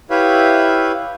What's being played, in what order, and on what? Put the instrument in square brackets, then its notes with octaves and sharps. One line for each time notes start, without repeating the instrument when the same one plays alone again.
[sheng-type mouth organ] E4 G4 B4 C#5 E5 F5